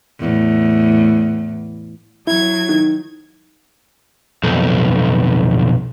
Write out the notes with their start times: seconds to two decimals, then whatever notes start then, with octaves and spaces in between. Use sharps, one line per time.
0.20 E2 A2
2.27 F#3 E4 G#6
2.69 D#3
4.43 B1 F2